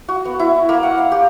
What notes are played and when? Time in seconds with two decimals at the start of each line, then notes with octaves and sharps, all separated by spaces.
0.08 F#4
0.25 B3
0.40 E4
0.69 A#3
0.83 F#5
0.98 F5
1.12 G4